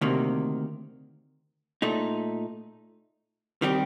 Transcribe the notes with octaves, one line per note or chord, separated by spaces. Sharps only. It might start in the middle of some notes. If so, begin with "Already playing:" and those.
D2 C3 D#3 A#3
A#2 A3 D#4
D#3 G3 C4 G4